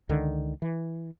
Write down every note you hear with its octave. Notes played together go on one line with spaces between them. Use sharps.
C#2 D3 D#3
E3